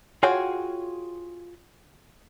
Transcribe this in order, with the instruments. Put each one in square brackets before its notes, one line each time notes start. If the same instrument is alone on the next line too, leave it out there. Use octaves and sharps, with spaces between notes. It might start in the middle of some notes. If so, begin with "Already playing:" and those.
[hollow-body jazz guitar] F4 F#4 G#4 C#5 G5